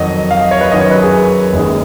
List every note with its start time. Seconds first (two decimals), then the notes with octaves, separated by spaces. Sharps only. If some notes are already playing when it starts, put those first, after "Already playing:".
Already playing: F2 D#3 F#3 D#5
0.31 F5
0.41 D#5
0.51 C#5
0.61 B4
0.71 F#2 D#3 F#3 C#4 D#5
0.81 C#5
0.91 B4
1.02 G#4
1.53 F#1 F#2 D#3 G#3